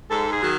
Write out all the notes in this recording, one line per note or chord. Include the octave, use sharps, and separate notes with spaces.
G#2 A4
G#4
D#3 F#3